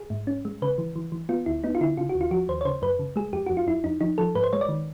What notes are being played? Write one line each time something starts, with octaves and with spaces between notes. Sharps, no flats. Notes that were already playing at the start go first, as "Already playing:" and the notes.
Already playing: G#4
G#2
C#4
G#3
C#3 B4
E3
E3
E3
B3 F4
D2 E4
B3 D#4
F4
D3 E4
C#3 F4
F#4
D#2
F4
F3 F#4
D#2 C5
C#5
C#3 C5
F#2 B4
C#3
G#3 G#4
F2 G4
F2 F#4
F4
F2 E4
F2 D#4
F3 D#4
F3 A4
G#2 B4
C5
G#3 C#5
D5
D#3